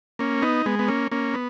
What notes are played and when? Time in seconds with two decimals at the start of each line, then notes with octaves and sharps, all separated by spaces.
0.19 A#3 C#4
0.42 B3 D#4
0.66 G#3 B3
0.79 B3
0.88 A#3 C#4
1.12 A#3 C#4
1.34 B3